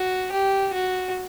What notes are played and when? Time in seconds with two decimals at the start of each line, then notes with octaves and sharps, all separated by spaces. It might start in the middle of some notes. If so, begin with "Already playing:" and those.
Already playing: F#4
0.32 G4
0.73 F#4